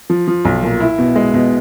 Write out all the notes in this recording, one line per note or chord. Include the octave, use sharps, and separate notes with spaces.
F3
F3
B1
A#2
E4
B2
G#3
B2